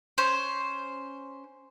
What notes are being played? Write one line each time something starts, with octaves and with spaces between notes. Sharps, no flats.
C#4 C5